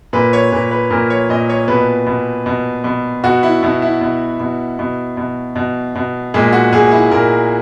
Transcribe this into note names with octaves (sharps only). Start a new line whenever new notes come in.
A#2 B4
C#5
A#2 B4
B4
A#2 A#4
C#5
A#2 D#5
C#5
B2 B4
B2
B2
B2
B2 F#4
E4
B2 E4
E4
B2
B2
B2
B2
B2
B2
A#2 G#3
F#4
A#2 G#4
E4
A#2 A#4